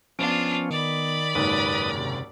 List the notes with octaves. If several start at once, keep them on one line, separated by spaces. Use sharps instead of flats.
F3 B3 C#4 D4 F4 D7
D#3 D5 B5
F#1 D#2 G#2 B4 D#6
C3